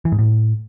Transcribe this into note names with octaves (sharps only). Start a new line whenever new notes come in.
E3
G#2
A2